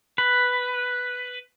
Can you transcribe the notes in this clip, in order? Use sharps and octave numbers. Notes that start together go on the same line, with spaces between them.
B4